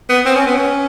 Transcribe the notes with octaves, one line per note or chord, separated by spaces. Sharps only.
B3
C4
C#4
B3
C#4